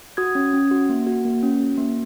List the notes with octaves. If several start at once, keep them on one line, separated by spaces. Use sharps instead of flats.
F#4 D#6 G#6
C#4
C#4
F#4
A#3
F#4
A#3
C#4
F#4
A#3